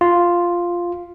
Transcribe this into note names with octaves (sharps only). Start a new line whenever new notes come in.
F4